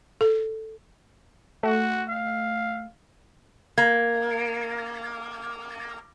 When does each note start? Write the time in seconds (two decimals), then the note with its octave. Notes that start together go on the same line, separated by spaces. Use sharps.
0.21 A4
1.63 A3 F#4
2.09 F5
3.78 A#3 G#6